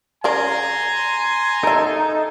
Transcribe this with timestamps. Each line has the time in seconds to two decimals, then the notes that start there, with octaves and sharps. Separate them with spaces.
0.24 C#3 A#4 D5 G#5 A#5 C6
1.63 D#4 A4 A#4 E5